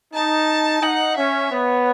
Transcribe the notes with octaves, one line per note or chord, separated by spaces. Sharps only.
D#4 A5
D#4 F#5
C#4 E5
B3 C#5